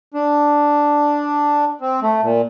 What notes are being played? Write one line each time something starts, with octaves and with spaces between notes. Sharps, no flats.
D4
C4
A3
A#2